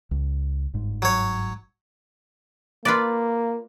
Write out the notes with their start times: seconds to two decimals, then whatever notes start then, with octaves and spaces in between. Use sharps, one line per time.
0.11 C#2
0.74 G1 G#2
1.02 F#3 C#5
2.85 A#3 F4 B4 D5